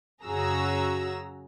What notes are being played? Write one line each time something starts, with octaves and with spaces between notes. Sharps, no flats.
F#2 C#3 F#4 G#4 A#5 E6